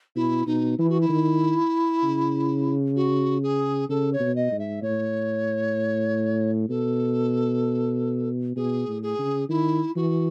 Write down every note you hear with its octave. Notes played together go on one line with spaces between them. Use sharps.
B2 E4
B2 D#4
E3 E4
F#4
E4
D#3
C#3
F#4
G#4
C#3 A4
C#5
B2
D#5
G#2
E5
A2 C#5
B2 A4
B2 G#4
A2
G#4
C#3
D#3 E4
E3 F#4